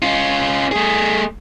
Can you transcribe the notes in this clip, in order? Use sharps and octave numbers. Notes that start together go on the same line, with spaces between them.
C#4 F4
A3 G#4